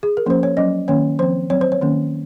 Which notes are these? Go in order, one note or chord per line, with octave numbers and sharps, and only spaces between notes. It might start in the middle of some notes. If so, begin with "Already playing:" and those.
G#4
A#4
F3 A#3 C#4 C5
C#5
F#3 C#4 D#5
D#3 A#3 C#4 C#5
F3 C4 C5
F#3 C4 C#5
C5
C#5
D#3 A#3 C#4